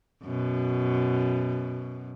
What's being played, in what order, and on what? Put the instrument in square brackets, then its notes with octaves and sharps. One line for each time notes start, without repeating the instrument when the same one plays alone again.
[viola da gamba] F#2 B2